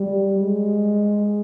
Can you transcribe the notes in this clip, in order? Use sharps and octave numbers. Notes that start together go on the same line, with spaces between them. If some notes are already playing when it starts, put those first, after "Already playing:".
Already playing: G3
G#3